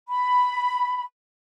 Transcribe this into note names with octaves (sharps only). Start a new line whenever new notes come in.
B5